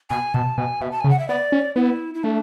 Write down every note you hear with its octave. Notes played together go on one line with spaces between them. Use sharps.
B2 G#5
B2 A5
B2 G#5
B2 E5
A5
C#3 G#5
F#5
E5
B3 D5
C#4
B3 E4
E4
A3 D4